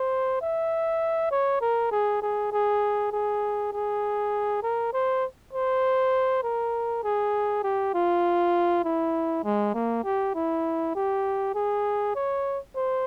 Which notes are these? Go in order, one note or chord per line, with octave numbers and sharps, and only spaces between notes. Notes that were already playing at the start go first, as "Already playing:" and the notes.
Already playing: C5
E5
C#5
A#4
G#4
G#4
G#4
G#4
G#4
A#4
C5
C5
A#4
G#4
G4
F4
E4
G#3
A#3
G4
E4
G4
G#4
C#5
C5